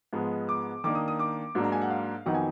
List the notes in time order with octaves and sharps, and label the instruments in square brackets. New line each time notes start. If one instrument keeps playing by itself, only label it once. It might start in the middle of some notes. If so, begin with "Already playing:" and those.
[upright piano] G#2 F3 G#3 B3
D6
D#3 A#3 D4 D6
D#6
D#6
D6
G#2 F#3 A#3 D4
A#5
G#5
F#5
F5
F2 D#3 F#3 B3 D#4 F#5
G#5